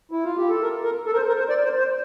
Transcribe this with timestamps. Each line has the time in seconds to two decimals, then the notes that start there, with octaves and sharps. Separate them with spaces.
0.11 E4
0.24 F4
0.37 G4
0.49 A4
0.62 A#4
0.84 A#4
1.06 A4
1.13 A#4
1.16 C5
1.28 A#4
1.39 C5
1.49 D5
1.64 C5
1.79 C5